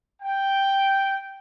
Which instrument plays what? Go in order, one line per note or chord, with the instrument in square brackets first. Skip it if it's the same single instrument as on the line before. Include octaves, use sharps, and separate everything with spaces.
[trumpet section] G5